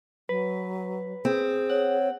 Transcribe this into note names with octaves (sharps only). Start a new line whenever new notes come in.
F#3 B4
C4 G#4
C#5 F#5